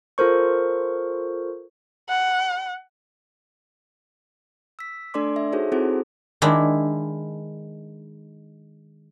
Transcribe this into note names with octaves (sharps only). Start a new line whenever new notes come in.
F4 A4 A#4 C5 C#6
F#5
E6 B6
A3 D4 A4 D5 C6 D6
E5
D#4 F#4 G#4 A4 C5 C#5
C4 E4 F#4 G#4 A4 C5
D#3 G#3 D4 E4